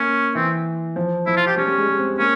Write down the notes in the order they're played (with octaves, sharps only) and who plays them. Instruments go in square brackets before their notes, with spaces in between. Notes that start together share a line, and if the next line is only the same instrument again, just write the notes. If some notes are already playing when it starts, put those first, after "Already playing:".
Already playing: [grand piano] A#3 [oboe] C#4
[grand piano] E3 [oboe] C4
[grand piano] F3
[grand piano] F3 [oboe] E4
[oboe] F4
G4
[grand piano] G3 [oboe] C#4
[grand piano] G3
G#3
G#3
C4
[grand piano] A#3 [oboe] C#4